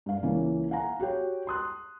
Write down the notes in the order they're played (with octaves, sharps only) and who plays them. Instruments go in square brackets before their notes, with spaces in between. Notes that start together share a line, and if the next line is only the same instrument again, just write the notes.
[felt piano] G2 F5
C#2 E3 A#3 C#4
F5 F#5 G#5 A#5
F#4 G4 C#5 G5
C6 D#6 F#6